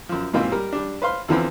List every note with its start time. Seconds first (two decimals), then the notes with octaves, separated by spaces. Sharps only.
0.09 F#2 F3
0.33 G#2 B2 E3 A#3 C4 F4
0.52 G3 A#4
0.73 G3 D4
1.02 B4 C5 F5 C6
1.28 E2 D3 E3 F3 B3 C4